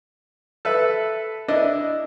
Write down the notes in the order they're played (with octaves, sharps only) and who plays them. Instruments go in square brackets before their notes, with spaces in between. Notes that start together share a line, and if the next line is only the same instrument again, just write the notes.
[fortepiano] A4 B4 E5
[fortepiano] D4 E4 [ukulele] D#5